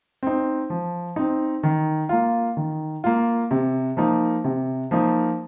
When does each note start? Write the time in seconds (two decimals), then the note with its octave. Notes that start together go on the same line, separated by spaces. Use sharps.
0.23 C4 D#4
0.70 F3
1.16 C4 D#4
1.63 D#3
2.09 A#3 F4
2.57 D#3
3.04 A#3 F4
3.51 C3
3.97 F3 A#3 D#4
4.44 C3
4.91 F3 A#3 D#4